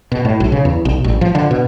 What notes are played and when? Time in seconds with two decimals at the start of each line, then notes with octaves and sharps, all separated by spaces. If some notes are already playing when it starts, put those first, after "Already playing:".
0.12 B2
0.25 A2
0.40 B1
0.52 C#3
0.65 E2
0.85 B1
1.04 A1
1.21 F3
1.35 D3
1.51 B2